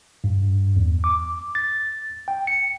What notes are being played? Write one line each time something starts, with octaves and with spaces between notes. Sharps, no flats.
G2
E2
D6
A6
G5
C#7